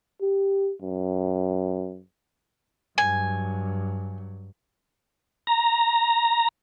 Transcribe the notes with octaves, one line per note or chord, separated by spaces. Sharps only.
G4
F#2
G2 F#3 G#5
A#5